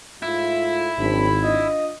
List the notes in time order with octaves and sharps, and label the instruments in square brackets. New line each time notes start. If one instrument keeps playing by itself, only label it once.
[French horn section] G#2 A3 F4 [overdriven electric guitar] E4
[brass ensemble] G#1 [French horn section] F#3 C4 D4 [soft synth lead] B5
[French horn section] D4 F4 [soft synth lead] D#5